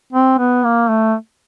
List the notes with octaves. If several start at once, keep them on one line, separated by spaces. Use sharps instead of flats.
C4
B3
A#3
A3